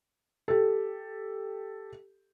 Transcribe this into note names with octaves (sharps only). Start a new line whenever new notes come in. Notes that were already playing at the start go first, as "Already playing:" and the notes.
G4 A4